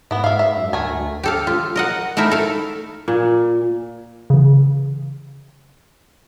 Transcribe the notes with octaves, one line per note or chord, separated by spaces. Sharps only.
G#2 B3 E4
G#2 E5 F5
E5
F#2
D2 A3 A#4 G#5
G4 A4 F5
F4
A#4 D#5 F#5
A3 D#4 E4 A#4 E5
A4 F5
A#2
C#3 E3